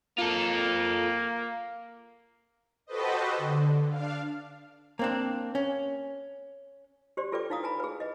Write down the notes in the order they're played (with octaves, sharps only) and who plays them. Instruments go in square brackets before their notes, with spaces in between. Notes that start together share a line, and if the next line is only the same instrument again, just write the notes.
[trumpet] A#3 [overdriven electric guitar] F4 A4
[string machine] F#4 G4 A4 B4 C5 D#5
D3
D4 F5
[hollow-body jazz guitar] A#3 C4 D4
C#4
[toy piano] G4 C5 D5 C6
F4 A4 B4 D5 G5 D6
D#4 E4 F5 A#5 D#6
B4 G#5 A#5 B5
G#4 B4
B4 D#5